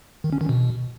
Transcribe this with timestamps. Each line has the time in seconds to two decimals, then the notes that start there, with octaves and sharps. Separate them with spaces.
0.24 D#3
0.33 C#4
0.41 D#3
0.49 B2